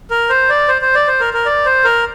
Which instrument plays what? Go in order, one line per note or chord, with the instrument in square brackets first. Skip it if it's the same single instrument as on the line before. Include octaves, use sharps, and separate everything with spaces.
[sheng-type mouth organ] A#4
C5
D5
C5
C5
D5
C5
A#4
A#4
D5
C5
A#4